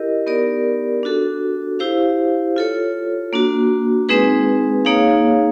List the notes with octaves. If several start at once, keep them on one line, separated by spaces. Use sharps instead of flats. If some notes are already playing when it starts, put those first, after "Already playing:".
Already playing: E4 G4 A#4 D#5
B3 D#4 G4 A#4 D5
D4 F#4 A4
E4 G4 C5 F5
F4 A4 C#5
A#3 D4 F#4
G#3 C4 D#4 G#4 B4
A#3 D#4 G#4 C#5 F5